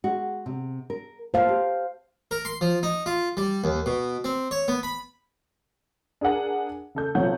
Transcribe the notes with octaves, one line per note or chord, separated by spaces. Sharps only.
G#3 F#4
C3
A#4
A#3 F4 A4 C5 F5
G4
A#4
C6
F3
D#4
F4
G3
D#2
B2
C4
C#5
B3
B5
D4 G#4 A#4 F#5 G#5
C#3 A4 G6
B1 C3 F3 C#5 F#5 G6